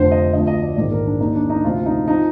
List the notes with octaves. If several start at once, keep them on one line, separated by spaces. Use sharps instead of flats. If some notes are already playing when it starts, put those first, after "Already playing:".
Already playing: F1 F2 D3 F3 C5
D#5
D2 D3 F3 D#5
D#5
D5
A#1 G#2 D#3 D5
A#4
D4
D#2 D#3 D#4
D4
D#4
D2 C3 F3 F4
D#4
F3 D#4